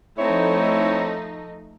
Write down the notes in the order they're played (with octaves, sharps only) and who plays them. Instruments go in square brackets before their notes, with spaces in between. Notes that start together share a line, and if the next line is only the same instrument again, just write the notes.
[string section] F3 A3 D#4 [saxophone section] C4 E4 C#5